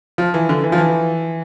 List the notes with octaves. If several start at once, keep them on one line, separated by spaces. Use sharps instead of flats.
F3
E3
D3
E3
F3
E3